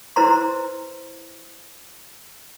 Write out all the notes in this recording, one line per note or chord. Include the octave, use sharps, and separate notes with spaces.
E4 B4 C5 A#5 C6